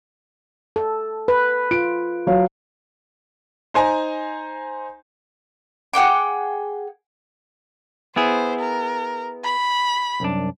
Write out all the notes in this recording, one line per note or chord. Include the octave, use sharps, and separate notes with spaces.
A4
B4
F4 D7
F#3 C#5 F5
D#4 C5 G#5 A#5
G#4 F#5 G5 D6
B3 E4 G#4 C5
A#4
B5
C2 F#2 D4